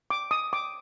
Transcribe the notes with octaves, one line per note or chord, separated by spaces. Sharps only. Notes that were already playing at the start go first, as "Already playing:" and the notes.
D6
D#6
D6